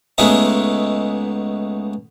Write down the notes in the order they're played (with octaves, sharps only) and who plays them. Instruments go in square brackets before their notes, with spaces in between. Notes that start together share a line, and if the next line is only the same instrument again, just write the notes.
[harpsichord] C#2 G#3 A3 B3 D#4 A4